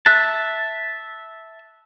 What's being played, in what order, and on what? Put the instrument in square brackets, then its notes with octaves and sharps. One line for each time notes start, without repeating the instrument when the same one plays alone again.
[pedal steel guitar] E5 A5 [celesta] F#6